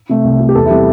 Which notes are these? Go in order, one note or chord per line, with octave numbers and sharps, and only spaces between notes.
C3 A3
C2
C3 A3
G4
E2 A4
E4
C3 G3 G4